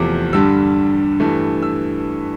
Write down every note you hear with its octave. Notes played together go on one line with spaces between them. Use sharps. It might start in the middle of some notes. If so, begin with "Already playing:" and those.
Already playing: E2 C3 F3 A3 D6
G2 D3 G3 E6
G2 E3 A3
E6